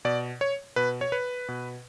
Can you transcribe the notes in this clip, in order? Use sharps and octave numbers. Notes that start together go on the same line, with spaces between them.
B2 D5
C#5
B2 B4
C#5
B4
B2